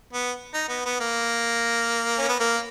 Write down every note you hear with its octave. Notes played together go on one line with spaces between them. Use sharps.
B3
D#4
B3
B3
A#3
C#4
B3
A#3